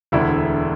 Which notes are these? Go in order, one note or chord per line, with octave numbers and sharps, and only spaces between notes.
E1 D2 D3 E4 E5